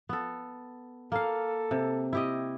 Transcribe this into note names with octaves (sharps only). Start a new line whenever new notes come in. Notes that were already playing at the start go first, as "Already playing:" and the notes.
B3 A4
A#3 A4 F5
C3
E4 G4 D#5